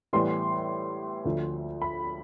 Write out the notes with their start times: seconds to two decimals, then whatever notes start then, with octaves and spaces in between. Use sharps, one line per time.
0.13 A2 E3 G3 B3 C6
1.25 D2 D3 F3
1.82 B5